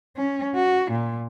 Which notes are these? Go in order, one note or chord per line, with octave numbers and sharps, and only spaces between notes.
C#4
F#4
A#2